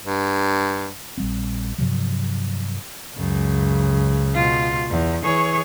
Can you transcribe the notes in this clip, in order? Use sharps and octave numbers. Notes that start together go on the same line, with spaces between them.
G2
A#1 G3 C4
G2 C3 F3 F#3
C#2 F#2 C#3
B2 F4
E2
E3 G#4 C#5